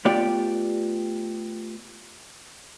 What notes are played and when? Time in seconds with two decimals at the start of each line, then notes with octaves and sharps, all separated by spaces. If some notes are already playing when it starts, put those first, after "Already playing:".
0.05 A3 B3 F4 G4 D5